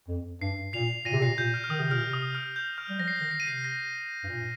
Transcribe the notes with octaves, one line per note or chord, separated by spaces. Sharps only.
F2
G2 C7
A#2 C7 F7
A#2 A#6 D#7
C3
A#2 C7
A#2 G6
F6
F6
D#3 D#6
C3
A#2 F6
C3
D#6
F6
G6
F6
G3
F3 A#6
C7
D#3 A#6
C7
D#7
C3 C7
A#6
G2
A#2